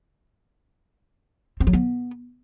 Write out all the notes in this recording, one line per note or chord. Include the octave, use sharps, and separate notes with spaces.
C4
F#3
B3